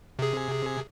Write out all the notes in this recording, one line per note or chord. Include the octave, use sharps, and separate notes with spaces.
C3 G#4